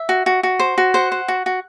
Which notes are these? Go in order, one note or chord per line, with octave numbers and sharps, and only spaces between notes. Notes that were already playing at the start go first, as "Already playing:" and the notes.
Already playing: E5
F#4
F#4
F#4
C5
F#4
C5 F#5
C5
F#4
F#4